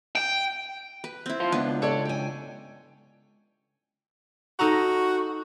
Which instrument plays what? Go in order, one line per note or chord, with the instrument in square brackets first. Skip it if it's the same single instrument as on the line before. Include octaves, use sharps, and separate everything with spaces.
[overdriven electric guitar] G5
[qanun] B4
C4 E4
[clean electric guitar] F4 C5
[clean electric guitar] C#2 [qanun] B3 D4 B4
[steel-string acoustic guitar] A4 C#5 D5
G5 G#5
[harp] D#4 A4 A#5 [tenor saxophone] F#4